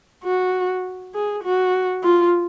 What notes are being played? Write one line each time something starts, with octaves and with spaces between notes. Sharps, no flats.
F#4
G#4
F#4
F4